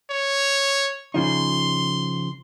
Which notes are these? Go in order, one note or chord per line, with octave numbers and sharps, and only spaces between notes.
C#5
C#3 F3 D#4 C6